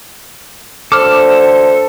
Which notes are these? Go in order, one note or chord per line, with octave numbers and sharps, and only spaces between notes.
D2 D3 A4 C5 D6 F6